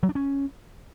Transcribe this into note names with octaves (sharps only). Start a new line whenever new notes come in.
F#3
D4
C#4